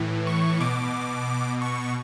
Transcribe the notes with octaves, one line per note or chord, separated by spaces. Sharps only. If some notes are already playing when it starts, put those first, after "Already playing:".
Already playing: A2 E3
C#6
B2 D6
C#6